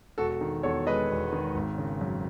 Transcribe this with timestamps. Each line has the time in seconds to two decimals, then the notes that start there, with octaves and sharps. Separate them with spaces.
0.18 E1 F#4 A4
0.41 D#3
0.63 E2 A4 C#5
0.87 G#3 B4 D#5
1.10 E1
1.33 D#3
1.55 G#1
1.78 C#3
2.01 F#2